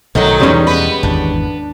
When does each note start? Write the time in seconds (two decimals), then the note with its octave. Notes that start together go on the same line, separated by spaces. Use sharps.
0.15 B1 A2 D3 D#3 F#3 A4 D#5 F#5
0.40 E2 B2 E3 G3 G#3 C#4 D#4
0.67 B3 B4 D#5
1.03 G#1 E2 D4